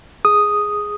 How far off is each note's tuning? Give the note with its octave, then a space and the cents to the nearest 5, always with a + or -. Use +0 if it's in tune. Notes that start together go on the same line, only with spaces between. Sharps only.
G#4 +0 D#6 +0